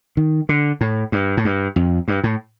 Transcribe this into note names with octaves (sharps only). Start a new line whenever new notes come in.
D#3
D3
A2
G2
A2
G2
F2
G2
A2